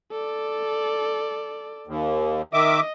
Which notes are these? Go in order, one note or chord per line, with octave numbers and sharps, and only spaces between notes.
A4 D5
D#2
D#3 D#5 E5 D6